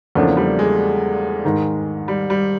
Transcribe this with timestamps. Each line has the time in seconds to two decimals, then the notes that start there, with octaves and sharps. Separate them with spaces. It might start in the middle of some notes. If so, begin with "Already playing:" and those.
0.15 E2 C#3 F3 A3 A#3 D4
0.37 G3
0.59 G#3
1.45 G#2 D#3 G#3
2.08 G3
2.30 G3